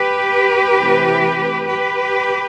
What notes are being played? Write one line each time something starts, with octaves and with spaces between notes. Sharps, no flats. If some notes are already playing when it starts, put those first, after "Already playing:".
Already playing: G4 B4
C3 E3 A3 C4
G4 B4